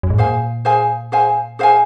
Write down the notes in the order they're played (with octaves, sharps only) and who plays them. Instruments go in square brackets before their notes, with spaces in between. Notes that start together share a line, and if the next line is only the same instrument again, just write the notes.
[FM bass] F#2
G#2
[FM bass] A#2 [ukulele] G#4 C5 F5 G#5
[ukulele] G#4 C5 F5 G#5
G#4 C5 F5 G#5
G#4 C5 F5 G#5